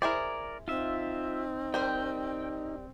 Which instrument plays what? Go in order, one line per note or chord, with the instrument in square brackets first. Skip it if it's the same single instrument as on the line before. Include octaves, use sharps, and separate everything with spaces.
[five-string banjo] E4 G#4 C5 [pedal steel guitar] A#4 D5
[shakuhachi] C4 [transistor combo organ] D#4 [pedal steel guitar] F4 E5
[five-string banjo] G3 A#4 C5 [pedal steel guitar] G5